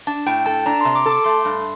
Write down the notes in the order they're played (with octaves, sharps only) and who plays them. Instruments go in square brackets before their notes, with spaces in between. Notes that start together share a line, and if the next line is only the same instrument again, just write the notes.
[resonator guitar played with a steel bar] D4 [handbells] A5
[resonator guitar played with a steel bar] A2 [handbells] G5
[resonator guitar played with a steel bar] A4 [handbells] A5
[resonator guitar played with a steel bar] D4 [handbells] A#5
[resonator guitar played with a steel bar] C3 [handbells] C6
[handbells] D6
[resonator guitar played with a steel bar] A4 [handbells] D6
[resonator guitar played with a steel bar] A3 [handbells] C6
[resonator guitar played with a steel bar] G2